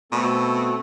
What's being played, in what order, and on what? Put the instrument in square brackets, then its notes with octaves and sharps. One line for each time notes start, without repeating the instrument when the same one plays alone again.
[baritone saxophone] B2 [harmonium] A3 C4 A4